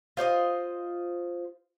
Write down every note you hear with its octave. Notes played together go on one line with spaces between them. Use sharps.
F4 C5 D5 D#5